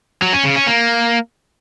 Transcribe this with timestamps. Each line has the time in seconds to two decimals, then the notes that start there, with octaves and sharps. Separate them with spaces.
0.22 F#3
0.33 C#4
0.45 C#3
0.56 C#4
0.67 A#3